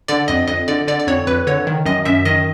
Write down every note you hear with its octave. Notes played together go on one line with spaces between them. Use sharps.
D3 D5
F2 D#5
F2 D#5
D3 D5
D3 D5
D5
F2 C#5
F2 B4
D3 C#5
D#3
F#2 D#5
F#2 E5
D#3 D#5